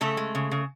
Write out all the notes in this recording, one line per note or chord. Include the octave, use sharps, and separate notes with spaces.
C#3 A3 A4
G#3
C#3
C#3